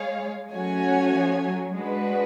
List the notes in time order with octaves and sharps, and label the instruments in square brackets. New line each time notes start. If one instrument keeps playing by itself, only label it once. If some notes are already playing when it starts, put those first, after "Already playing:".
Already playing: [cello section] G#3 [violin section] G#4 C#5 F5
[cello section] F#3 [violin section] A3 C#4 F#4 C#5 G#5
[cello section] F3
F#3
[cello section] G#3 [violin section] D4 F#4 B4